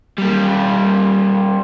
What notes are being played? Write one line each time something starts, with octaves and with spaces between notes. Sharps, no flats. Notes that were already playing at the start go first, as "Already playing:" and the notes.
G3 A#3